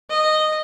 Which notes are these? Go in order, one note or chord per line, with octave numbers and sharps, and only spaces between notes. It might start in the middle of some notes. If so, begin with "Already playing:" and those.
D#5